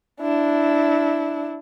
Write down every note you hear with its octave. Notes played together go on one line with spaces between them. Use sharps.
D4 E4